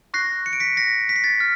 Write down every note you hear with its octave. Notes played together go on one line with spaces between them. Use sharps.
C#6 F#6 A#6 C7
C#7
D7
B6 C#7
A#6 C7
B6
C7
A6 B6
F6